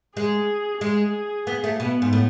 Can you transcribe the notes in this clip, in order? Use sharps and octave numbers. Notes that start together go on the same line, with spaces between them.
G#3 G#4
G#3 G#4
B3
A3
B2 B3
G#2
A2